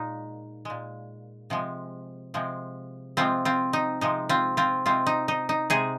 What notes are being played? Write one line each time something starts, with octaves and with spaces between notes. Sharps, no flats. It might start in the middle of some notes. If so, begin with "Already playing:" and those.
Already playing: A#2 G#3 D#4
A#2 G#3
C3 F3 G#3
C3 F3 G#3
C3 F3 G#3 C4 F4
C4 F4
D#4
C3 F3 G#3 D#4
C4 F4
C4 F4
C3 G#3 C4 F4
D#4
D#4
D#4
C3 G#3 D#4 G#4